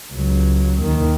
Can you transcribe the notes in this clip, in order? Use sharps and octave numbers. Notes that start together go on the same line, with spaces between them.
C#2 F#3
D#2 D#3